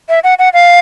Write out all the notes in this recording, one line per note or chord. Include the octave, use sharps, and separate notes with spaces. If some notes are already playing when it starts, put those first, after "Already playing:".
E5
F#5
F#5
F5